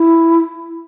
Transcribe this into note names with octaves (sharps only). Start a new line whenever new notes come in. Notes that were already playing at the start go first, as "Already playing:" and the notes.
Already playing: E4